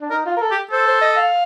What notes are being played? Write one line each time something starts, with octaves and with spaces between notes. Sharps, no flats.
D4
D#4 A#4
F4
A#4
A4
G4
A4 C5
C5
D#5
F5